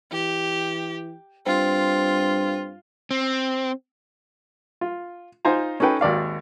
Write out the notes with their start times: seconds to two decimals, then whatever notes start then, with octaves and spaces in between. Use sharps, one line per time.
0.12 E3 G4
1.47 G2 C4 F4
3.11 C4
4.81 F4
5.45 D#4 F4 C5 G#5 A#5
5.80 C#4 D#4 A4 B4 G5
6.01 G#1 D#2 D5 F5